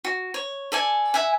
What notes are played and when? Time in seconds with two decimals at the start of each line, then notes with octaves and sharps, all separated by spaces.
0.05 F#4
0.34 C#5
0.72 A4 D5 G#5
1.14 E5 F#5 G#5